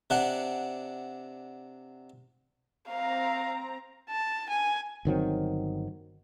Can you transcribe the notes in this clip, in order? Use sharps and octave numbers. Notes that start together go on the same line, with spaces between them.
C3 D4 F#5
C4 F5 A#5
A5
G#5
G1 D#3 F#3 C4